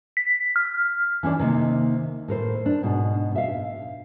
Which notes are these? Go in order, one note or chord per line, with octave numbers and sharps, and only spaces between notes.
B6
F6
E3 C#4 D4 D5
C3 D#3 A#3
A2 A#4 C5
D4
G#2 B2
E5 F5